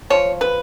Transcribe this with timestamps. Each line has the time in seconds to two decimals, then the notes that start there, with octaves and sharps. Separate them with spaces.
0.10 F3 C#5
0.41 B4